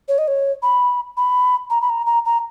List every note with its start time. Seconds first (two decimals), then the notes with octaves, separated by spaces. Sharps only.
0.08 C#5
0.18 D#5
0.28 C#5
0.62 B5
1.17 B5
1.70 A#5
1.82 B5
1.89 A#5
2.06 A#5
2.25 A#5